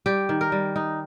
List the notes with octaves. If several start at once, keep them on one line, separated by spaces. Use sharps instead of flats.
G3 G4
D#3
A#4
G3
D#4